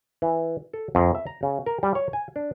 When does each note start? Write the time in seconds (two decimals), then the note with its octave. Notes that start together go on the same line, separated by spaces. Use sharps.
0.22 E3
0.73 A4
0.95 F2
1.15 E5
1.27 A#5
1.43 C#3
1.66 A#4
1.83 G3
1.95 C#5
2.13 G#5
2.36 D4